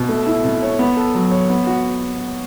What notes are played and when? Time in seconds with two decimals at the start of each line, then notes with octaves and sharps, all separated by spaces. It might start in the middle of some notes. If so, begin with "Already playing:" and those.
Already playing: B2
0.09 A3
0.26 E4
0.44 B2
0.62 C#5
0.79 B3
0.97 A4
1.15 F#3
1.31 C#5
1.49 B3
1.67 F#4